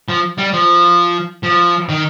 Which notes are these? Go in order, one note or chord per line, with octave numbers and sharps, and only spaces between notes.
F3
G3
F3
F3
D#3